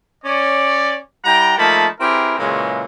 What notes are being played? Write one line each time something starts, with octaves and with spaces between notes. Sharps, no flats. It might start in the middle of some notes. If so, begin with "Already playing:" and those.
C#4 C#5 D5
G3 E4 F#5 G5 A#5
F3 A3 A#3 D#4 A5 B5
C4 E4 G4 G#4 A#4 B4
A#2 C#3 E3 F#3 G#3